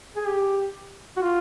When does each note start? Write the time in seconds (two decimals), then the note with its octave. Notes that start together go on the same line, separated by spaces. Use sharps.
0.16 G#4
0.28 G4
1.17 F#4
1.22 F4